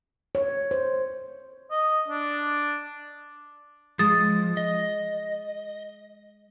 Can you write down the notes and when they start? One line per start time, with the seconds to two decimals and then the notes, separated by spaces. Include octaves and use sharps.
0.35 C#5
0.71 C5
1.71 D#5
2.08 D4
3.99 F3 G#3 D#6 A6
4.57 D#5